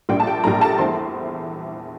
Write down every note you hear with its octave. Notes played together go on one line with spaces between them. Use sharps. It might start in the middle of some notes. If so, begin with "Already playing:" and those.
A#1 A#2 G3 D4 G4 G5
A5
G4 G5
A#1 A#2 G3 D4 A#4 A#5
A4 A5
E2 E3 A3 C5 C6